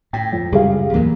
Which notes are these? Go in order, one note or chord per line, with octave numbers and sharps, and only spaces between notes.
A2 G5
F2
C#2 F#2 G3 G#4 F5
E2 A2 F#3 A#3